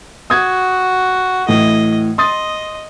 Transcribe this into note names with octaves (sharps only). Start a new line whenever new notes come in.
F#4 D#6 G#6
A2 E3 D#5
D#5 C6 D#6 A6